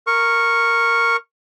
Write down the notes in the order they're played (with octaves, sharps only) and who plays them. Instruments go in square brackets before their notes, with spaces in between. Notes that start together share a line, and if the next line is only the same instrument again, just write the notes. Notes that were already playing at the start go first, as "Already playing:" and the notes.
[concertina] A#4 C#6